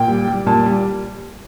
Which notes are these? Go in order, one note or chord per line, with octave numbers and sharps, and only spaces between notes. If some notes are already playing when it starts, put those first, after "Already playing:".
Already playing: A#2 G5
G3
G3
A#2 A5
G3